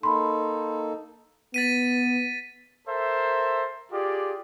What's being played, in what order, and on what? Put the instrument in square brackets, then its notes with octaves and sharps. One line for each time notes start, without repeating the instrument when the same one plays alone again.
[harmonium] A#3 D#4 A4 [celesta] B5 C6
[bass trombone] B3 [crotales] A6 B6 D#7
[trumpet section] A4 A#4 C5 E5
F4 G4 G#4 D5